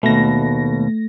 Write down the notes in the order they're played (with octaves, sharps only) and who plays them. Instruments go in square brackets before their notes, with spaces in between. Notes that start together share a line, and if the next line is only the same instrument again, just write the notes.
[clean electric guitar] D#2 B2 [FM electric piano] A3 A#6